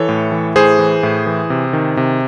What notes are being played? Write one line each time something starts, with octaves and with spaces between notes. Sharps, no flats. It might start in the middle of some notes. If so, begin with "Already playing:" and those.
Already playing: E3 A4 C#5
A2
E3
A2 G#4 C5
E3
A2
E3
C3
D#3
C3